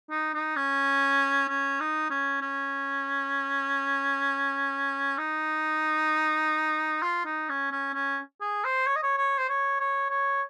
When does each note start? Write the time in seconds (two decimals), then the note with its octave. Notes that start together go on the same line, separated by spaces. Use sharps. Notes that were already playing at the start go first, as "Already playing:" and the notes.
0.11 D#4
0.34 D#4
0.56 C#4
1.49 C#4
1.80 D#4
2.10 C#4
2.42 C#4
5.18 D#4
7.02 F4
7.25 D#4
7.49 C#4
7.71 C#4
7.94 C#4
8.41 G#4
8.65 C5
8.87 C#5
8.96 D#5
9.03 C#5
9.17 C#5
9.38 C5
9.49 C#5
9.80 C#5
10.10 C#5